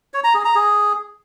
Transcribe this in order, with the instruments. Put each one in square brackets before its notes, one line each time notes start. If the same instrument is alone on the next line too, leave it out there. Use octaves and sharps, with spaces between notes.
[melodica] C#5
A#5
G#4
A#5
G#4